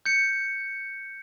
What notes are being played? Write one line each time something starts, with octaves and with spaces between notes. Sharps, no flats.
G6 C#7